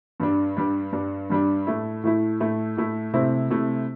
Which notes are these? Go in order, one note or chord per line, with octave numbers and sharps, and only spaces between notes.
G2 G3 D4
G2 G3 D4
G2 G3 D4
G2 G3 D4
A2 A3 E4
A2 A3 E4
A2 A3 E4
A2 A3 E4
C3 A3 C4 E4
C3 A3 C4 E4